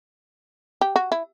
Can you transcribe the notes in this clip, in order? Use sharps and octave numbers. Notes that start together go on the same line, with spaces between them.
G4
F#4
E4